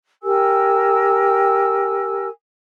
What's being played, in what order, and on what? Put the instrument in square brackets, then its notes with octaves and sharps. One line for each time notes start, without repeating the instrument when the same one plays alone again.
[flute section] G4 A#4 G#5 E6